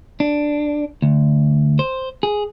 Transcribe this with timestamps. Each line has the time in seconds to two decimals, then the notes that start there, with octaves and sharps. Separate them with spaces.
0.20 D4
1.02 D2
1.79 C5
2.23 G#4